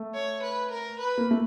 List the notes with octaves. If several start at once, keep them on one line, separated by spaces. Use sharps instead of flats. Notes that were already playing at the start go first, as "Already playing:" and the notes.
Already playing: A3
C#5
B4
A#4
B4
A#3
A3